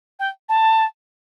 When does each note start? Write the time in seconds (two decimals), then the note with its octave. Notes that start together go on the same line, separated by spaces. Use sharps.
0.20 G5
0.49 A5